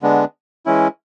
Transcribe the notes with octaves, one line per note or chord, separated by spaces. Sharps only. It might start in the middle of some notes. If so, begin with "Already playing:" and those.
D3 G#3 B3 D4
E3 G#3 C#4 E4